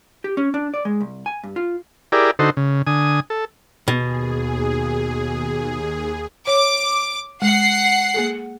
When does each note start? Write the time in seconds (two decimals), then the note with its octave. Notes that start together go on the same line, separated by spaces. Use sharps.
0.24 G4
0.37 C#4
0.54 D4
0.74 D5
0.85 G#3
1.01 C2
1.26 G#5
1.43 G2
1.56 F4
2.12 E4 G4 G#4 A#4 D5
2.39 D3 D#4 F#4 A4 C5
2.57 C#3
2.87 D3 G#5 D#6
3.30 A4
3.88 D#2 B2 G#4
6.47 C#5 D6
7.42 G#3 F#5 C7
8.14 A#3 G#4 A4